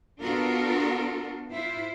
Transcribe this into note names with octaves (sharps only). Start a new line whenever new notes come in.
B3 D4 F4 F#4 A4 A#4
E4 F4 C5